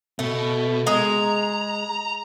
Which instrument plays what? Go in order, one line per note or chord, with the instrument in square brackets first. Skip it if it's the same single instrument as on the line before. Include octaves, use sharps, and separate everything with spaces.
[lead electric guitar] B2 [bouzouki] A3
[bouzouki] G#3 [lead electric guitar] A#5